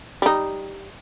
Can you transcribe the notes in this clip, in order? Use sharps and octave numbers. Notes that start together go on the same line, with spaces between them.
G3 D#4